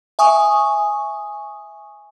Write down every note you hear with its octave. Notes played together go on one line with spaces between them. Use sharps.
E5 G#5 C#6 D#6